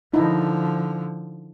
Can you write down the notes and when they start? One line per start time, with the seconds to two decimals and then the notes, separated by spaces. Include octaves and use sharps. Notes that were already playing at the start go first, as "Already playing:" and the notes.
0.14 D3 F3 D#4 E4